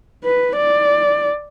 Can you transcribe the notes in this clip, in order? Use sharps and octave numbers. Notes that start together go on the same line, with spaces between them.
B4
D5